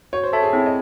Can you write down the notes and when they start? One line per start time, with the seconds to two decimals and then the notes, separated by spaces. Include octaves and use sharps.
0.13 F#4 C#5
0.23 C5
0.33 A4 C#5 E5 A5
0.43 G#4
0.53 C4 E4
0.66 D#5